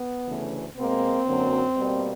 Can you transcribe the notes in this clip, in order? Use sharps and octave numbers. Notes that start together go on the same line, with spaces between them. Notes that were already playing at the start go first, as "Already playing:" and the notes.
Already playing: B3
D2 C#3 E3 A3
B2 G#3 A#3 C4
F#2 D3 F#3 A#3
B2 G3 A#3